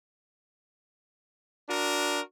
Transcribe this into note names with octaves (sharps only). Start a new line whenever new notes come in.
D4 F#4 A#4